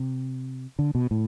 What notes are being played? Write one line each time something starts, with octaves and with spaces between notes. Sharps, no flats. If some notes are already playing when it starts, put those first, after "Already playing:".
Already playing: C3
D3
B2
A2